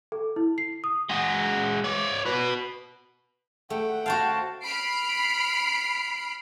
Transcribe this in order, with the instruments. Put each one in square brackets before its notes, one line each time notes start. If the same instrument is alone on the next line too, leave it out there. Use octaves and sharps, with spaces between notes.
[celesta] A4
E4
C7
D#6
[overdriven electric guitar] G#3 F#4
C#5 D5
F#4 B4
[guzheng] A3 [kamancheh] F#5 G5
[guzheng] F#4 C5 F5 [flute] A5
[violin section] B5 F6 C7 D7